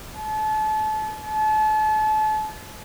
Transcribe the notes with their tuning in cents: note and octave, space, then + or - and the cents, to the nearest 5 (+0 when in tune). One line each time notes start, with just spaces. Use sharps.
A5 -30
A5 -35